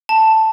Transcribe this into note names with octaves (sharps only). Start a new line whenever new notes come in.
A5